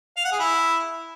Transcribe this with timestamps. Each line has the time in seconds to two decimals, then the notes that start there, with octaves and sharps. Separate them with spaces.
0.17 F5
0.24 F#5
0.32 G#4
0.40 E4